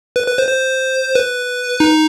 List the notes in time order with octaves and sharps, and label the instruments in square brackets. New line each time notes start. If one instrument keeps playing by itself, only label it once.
[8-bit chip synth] B4
B4
C5
C5
B4
D#4